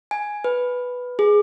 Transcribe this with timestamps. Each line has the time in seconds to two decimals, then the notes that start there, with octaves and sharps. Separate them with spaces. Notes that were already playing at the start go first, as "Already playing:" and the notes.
0.11 G#5
0.44 B4
1.19 G#4